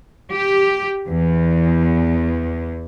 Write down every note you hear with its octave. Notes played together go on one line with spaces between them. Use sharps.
G4
E2